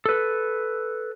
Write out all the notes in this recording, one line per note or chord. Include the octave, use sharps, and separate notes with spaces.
A4 B4